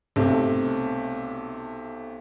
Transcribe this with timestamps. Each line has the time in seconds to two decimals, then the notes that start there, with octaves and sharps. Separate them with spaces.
0.16 B1 C3 A3